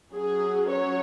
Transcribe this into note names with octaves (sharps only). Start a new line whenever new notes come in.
F#3 C#4 G#4
C#5